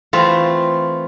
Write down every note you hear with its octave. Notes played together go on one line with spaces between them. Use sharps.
E3 A3 C4 F4